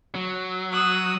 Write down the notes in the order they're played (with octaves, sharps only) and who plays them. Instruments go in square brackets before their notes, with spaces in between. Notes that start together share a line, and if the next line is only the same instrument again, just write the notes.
[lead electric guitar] F#3
[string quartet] D#6 E6 F#6